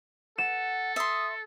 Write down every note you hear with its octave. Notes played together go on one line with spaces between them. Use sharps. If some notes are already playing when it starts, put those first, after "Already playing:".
A4 F#5 E7
E5 C6 D#6